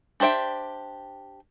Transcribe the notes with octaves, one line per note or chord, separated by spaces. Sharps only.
D4 G4 C5 E5 G5